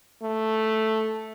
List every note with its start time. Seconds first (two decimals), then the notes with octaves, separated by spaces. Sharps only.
0.22 A3